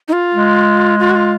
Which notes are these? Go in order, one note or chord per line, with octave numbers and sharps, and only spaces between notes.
D#4
F4
G#3
F4
F#4
F4